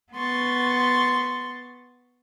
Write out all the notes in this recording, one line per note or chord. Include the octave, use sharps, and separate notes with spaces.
B3 C6 C#6 A6